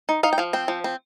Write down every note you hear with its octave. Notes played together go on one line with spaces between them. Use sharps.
D#4
D#4 F5
G5
F3 F5
C4 G5
F3
C4